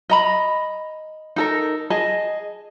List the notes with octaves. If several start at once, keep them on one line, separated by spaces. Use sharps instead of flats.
D#5 A#5 B5
D#4 A4 A#4
G#4 D#5 A5